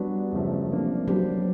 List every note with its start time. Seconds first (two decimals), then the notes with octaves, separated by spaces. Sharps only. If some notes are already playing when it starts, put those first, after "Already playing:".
Already playing: F#3 G3 B3 D4 F#4 B4
0.32 F#2 C#3 F3 A3
0.70 C3 F3 A#3 D4
1.08 F#3 G3 B3 D4 G4 C5